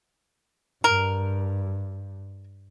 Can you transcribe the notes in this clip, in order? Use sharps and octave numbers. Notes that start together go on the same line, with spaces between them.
G2 A#4